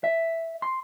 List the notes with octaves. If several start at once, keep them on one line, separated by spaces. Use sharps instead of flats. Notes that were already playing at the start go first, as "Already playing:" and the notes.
E5
C6